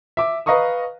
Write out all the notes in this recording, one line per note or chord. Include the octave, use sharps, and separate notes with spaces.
E5 D6
B4 D#5 F5 A#5 C#6 D#6